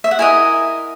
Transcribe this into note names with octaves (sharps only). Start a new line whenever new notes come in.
E5
F#5
E4 A#4 D#5 G#5